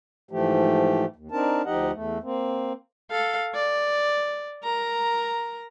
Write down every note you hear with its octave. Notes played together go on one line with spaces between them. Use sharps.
G#2 E3 F3 A3 G4
D#2
C4 D4 D#4 A#4 A5
D2 F3 D#4 G4 D#5 F#5
E2 A3
A#3 C4
A4 F5
D5
A#4 A#5